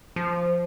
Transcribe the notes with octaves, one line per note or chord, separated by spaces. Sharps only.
F3